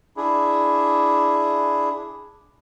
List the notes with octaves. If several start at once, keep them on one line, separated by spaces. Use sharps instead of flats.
D4 E4 G#4